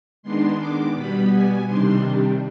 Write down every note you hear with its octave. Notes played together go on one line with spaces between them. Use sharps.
D#3 G#3 B3 D4 C6
D6
B2 G3 B3 B5
G#5
C3 D#3 G3 D4 C6